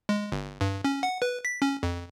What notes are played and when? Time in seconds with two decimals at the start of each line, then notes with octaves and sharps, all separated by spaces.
0.09 G#3
0.32 G1
0.61 G2
0.84 C#4
1.03 F#5
1.22 B4
1.45 B6
1.62 C#4
1.83 F2